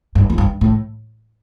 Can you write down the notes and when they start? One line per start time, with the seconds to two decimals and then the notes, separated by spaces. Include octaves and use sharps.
0.15 G2
0.30 F2
0.38 G2
0.61 A2